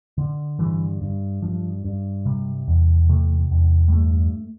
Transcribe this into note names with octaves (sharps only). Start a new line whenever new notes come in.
D3
G2 E3
G2
G2 F3
G2
C3 G3
E2
C3 A3
E2
G3
G2 A3